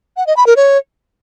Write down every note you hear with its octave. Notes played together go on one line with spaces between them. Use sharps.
F#5
D#5
B5
A#4
C#5